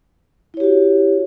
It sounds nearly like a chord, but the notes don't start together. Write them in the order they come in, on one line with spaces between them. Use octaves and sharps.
E4 C#5 G4 F#4